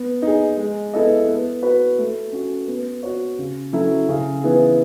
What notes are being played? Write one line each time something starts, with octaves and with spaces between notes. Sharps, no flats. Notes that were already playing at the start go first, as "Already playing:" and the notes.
Already playing: B3
D#4 G#4
G#3
B3 E4 A4 D#5
B3
F#4 B4
A3
C#4 F#4
B3
F#4 C#5
C#3
F#3 C#4 E4 A4
C#3
E3 B3 E4 G#4